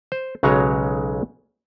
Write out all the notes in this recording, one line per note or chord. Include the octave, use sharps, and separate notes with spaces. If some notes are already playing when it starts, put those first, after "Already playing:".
C5
B1 C#3 F#3 G#3 C#5 A#5